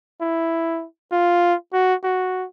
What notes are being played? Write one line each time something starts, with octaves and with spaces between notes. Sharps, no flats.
E4
F4
F#4
F#4